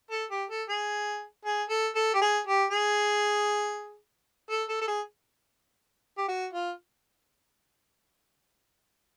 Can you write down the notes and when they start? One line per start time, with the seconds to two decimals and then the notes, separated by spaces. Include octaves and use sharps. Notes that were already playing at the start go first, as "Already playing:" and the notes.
0.11 A4
0.31 G4
0.50 A4
0.69 G#4
1.45 G#4
1.70 A4
1.96 A4
2.14 G4
2.21 G#4
2.47 G4
2.71 G#4
4.50 A4
4.69 A4
4.81 A4
4.88 G#4
6.18 G4
6.28 F#4
6.53 F4